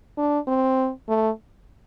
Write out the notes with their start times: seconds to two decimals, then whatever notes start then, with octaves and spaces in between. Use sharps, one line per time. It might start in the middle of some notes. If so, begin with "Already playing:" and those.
0.18 D4
0.48 C4
1.09 A3